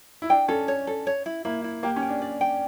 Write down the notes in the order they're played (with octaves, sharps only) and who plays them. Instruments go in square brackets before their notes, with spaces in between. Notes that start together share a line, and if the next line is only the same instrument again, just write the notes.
[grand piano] E4
[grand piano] D4 [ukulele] G5
[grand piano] C#4 [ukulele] A4
[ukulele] C#5
A4
C#5
E4
[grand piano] A#3 [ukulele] E4
[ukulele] E4
[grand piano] A#3 [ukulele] G4
[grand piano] C#4
[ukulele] G5
[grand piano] D4
[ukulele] D5
G5